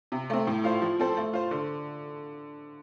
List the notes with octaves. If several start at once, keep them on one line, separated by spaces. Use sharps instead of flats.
C3
A3 C4
A2
A3 F4 C5
F3
C4 A4 C5
A3
F4 C5
D3